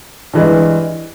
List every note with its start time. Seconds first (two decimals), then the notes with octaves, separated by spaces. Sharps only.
0.33 G2 E3 G#3